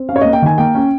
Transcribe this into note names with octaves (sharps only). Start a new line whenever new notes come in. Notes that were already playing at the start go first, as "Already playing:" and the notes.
Already playing: C4
C#4 F5
C#5
A#3 D#5
G5
D#3 G#5
A#3 G5
C#4